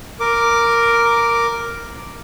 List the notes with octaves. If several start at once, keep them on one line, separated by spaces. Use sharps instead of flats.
A#4 D6